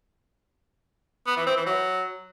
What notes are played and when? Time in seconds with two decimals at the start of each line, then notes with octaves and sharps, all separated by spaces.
1.27 B3
1.37 E3
1.46 C4
1.56 E3
1.66 F#3